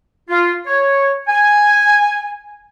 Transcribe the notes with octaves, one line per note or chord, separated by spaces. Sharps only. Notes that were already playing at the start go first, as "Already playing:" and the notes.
F4
C#5
G#5